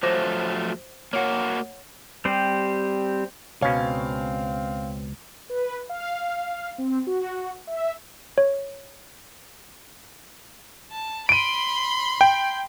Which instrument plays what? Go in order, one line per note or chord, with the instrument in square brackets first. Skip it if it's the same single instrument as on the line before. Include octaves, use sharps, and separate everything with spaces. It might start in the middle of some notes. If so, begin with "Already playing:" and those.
[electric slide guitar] F3 F#3 A3 [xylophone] C5 D6 A#6
[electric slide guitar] A#3 F#4 [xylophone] C#5 F#5
[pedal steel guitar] G3 C4 G4 C5
[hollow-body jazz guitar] C#2 C#5 [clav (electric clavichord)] B2 C#4 [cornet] C4 [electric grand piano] F5
[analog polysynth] B4
F5
C4
F#4
E5
[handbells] C#5
[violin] A5
[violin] B5 C6 [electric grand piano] D7 D#7
[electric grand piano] G5